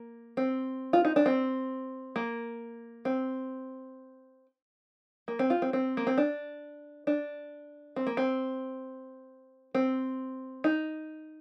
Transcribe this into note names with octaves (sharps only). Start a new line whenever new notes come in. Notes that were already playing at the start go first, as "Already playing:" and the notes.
Already playing: A#3
C4
F4
D#4
D4
C4
A#3
C4
A#3
C4
F4
C4
C4
A#3
C4
D4
D4
C4
A#3
C4
C4
D#4